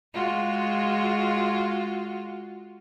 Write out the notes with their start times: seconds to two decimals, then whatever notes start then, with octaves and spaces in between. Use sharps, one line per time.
0.14 G#3 F4 F#4